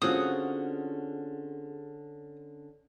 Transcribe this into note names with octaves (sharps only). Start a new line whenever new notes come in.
D3 C4 C#4 F4 F#4 G#4 F5 D#6